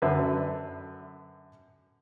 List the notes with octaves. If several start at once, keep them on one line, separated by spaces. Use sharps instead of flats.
F#2 D3 B4 E5